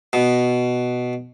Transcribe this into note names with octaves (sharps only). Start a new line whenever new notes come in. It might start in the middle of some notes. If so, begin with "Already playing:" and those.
B2